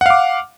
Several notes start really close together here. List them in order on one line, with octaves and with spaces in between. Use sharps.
F#5 F5 D6